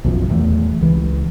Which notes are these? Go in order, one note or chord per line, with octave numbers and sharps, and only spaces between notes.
B1 F#2 F3
D#1 E2 F3 A3
C#2 E3